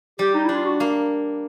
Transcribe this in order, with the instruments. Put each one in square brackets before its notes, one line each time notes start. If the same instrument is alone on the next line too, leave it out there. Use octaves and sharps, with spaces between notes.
[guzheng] G3 [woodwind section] G4
[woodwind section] D#4
[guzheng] D4 [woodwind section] E4
[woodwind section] F4
F#4
[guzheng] A#3